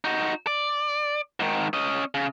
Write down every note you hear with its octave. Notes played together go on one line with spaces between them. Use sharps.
D#4 F#4
D5
G#2 D#3
C#4 D#5
C#3